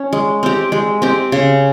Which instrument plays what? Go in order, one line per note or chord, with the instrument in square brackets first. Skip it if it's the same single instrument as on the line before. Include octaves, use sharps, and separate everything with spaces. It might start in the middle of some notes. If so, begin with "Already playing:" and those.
Already playing: [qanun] C#4
G#3
C4 G4
G#3
C4 G4
C#3